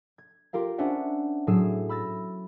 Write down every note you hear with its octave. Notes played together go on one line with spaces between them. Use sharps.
G#6
F4 G4 A#4 F5
C#4 D4 C5 E5 F#5
A2 F#3 G#4 E6 C7 E7
B5 E6 A6 A#6